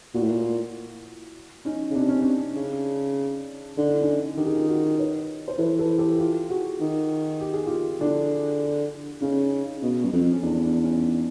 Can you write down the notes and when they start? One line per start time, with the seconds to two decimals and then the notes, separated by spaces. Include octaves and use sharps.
0.14 A#2 E4 F#4
0.22 A2
0.30 A#2
1.65 C#4 D#4
1.90 C#3
1.95 C3 D4
2.09 C#4
2.22 D4
2.56 C#3
3.77 D3 D#4
3.89 E4
4.01 C#4 D#4
4.37 D#3 G4
4.46 G#4
4.55 F4 G4
4.68 F#4 G#4
4.98 B4 C#5
5.48 C5
5.58 E3 A4 B4
5.79 A4 B4
5.98 G4 A4
6.19 F4 G4
6.49 F#4 G#4
6.80 D#3
7.41 G4
7.53 G#4
7.66 F4 G4
8.00 D3 D4 E4
9.21 C#3 C#4 D#4
9.82 B2
10.05 F#2
10.12 F2
10.32 C#4
10.42 E2 D4
10.63 D4
10.83 C#4 D#4